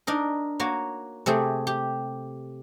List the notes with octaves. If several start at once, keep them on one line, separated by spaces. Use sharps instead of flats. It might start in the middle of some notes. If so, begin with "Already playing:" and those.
D4 D#4 A#4
A#3 F#4 C#5
C3 A3 G4 G#4
G4